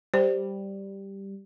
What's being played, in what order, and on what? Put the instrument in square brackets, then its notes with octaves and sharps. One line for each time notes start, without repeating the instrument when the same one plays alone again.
[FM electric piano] G3 [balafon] C5